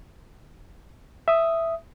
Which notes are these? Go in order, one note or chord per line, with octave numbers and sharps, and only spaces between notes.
E5 D#6